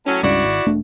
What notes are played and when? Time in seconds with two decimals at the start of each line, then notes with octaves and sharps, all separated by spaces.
0.07 A2 F#3 C#4
0.23 C#2 G2 C#3 E4 F#4 D5
0.44 G#1
0.66 E1 A3 D4